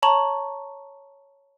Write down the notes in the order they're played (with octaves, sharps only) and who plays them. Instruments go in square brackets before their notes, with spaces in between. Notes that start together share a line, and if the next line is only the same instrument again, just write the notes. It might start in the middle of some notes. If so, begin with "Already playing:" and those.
[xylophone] C#5 A5 A#5 C#6 F#7